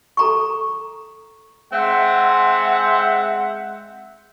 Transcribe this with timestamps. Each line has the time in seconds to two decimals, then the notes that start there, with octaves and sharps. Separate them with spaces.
0.17 A4 A#5 C#6
1.73 G#3 C4 E5 F#5